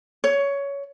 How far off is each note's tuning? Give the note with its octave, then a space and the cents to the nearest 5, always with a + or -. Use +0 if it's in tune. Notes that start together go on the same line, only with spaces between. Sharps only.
C#5 +15